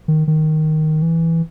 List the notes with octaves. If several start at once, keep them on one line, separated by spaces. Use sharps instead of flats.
D#3
D#3
E3